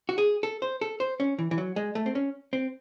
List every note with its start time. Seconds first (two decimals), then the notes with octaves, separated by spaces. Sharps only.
0.09 F#4
0.18 G#4
0.43 A4
0.62 C5
0.81 A4
1.00 C5
1.20 C#4
1.39 E3
1.51 E3
1.58 F#3
1.76 G#3
1.95 A3
2.06 C4
2.15 C#4
2.53 C4